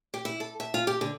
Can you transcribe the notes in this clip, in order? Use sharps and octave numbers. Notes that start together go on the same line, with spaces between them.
G4
E4
A4
E5
F4
G4
D3